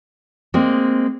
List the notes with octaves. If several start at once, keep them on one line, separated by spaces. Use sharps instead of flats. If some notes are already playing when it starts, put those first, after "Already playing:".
G#3 A#3 C4